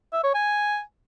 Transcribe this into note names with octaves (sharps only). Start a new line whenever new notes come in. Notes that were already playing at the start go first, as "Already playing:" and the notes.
E5
C#5
G#5